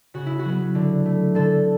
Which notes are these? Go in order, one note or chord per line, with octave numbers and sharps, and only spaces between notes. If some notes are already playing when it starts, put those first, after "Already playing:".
C#3 F#4
E4
F#4
F#3 B3
D3
A3
D3 A4